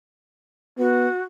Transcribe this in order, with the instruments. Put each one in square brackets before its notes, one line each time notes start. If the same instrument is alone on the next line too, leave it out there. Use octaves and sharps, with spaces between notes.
[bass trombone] B3 [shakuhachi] F#4